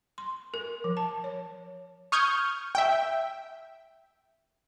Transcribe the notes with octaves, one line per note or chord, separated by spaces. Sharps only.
C6
A#4
F3
A5
C#5
C#6 D#6 F6 G6 G#6
E5 G5